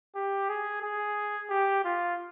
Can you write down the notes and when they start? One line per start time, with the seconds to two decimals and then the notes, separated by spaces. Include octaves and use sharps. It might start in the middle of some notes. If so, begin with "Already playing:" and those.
0.15 G4
0.49 G#4
0.82 G#4
1.50 G4
1.85 F4